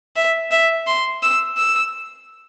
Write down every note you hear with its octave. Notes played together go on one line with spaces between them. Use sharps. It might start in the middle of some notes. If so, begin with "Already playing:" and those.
E5
E5
C6
E6
E6